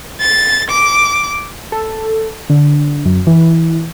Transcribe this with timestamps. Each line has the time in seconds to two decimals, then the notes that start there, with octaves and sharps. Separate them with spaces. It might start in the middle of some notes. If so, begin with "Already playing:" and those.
0.21 A6
0.71 D6
1.72 A4
2.50 D3
3.05 F#2
3.27 E3